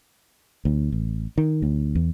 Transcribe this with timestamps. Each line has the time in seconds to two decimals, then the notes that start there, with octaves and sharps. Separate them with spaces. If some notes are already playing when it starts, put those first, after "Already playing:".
0.65 D2
0.92 A1
1.38 D#3
1.62 D2
1.95 E2